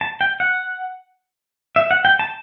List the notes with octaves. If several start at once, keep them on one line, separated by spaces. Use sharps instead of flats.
A5
G5
F#5
E5
F#5
G5
A5